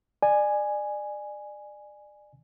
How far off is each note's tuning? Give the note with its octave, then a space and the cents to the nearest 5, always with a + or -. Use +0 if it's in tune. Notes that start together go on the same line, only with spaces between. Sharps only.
D5 +30 G#5 +0